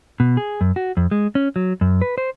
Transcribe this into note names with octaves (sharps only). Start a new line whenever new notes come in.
B2
G#4
F#2
F#4
F2
G#3
C#4
F#3
F#2
B4
C5